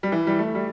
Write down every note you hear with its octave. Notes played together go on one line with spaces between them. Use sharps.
G3
E3
G3
A3
G3